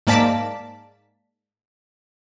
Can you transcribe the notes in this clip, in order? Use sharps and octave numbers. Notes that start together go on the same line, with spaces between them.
G#2 A#3 D5 A5 B6